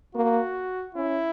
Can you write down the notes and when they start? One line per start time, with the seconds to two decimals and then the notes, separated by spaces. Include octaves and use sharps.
0.15 A#3 F#4
0.95 C#4 E4